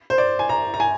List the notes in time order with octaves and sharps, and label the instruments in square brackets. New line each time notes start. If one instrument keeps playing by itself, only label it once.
[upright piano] C5
D5
G#5
A#5
A#5
G#5